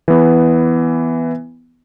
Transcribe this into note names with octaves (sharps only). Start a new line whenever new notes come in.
E3 B3